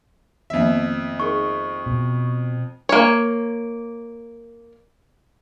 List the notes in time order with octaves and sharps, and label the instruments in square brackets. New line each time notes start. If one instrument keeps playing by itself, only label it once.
[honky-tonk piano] F2 E5 [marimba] D#3 A#3 B3
[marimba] D#4 G#4 A#4 [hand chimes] C#6
[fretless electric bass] B2
[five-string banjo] A#3 C#5